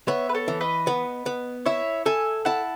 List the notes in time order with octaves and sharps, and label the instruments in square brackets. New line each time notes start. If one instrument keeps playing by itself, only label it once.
[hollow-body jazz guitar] B3 [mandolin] C#5 E5
[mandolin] B4
A4 C#5
[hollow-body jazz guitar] E3
[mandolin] B4 D#5
[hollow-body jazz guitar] B3
B3
[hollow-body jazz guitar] E4 [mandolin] C#5 E5
[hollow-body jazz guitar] A4 [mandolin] E5 G#5
[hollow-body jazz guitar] E4 [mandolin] F#5 A5